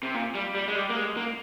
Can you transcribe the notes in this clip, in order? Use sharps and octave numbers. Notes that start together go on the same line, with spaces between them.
C3
A#2
G3
G3
G#3
G3
A#3
G#3
A#3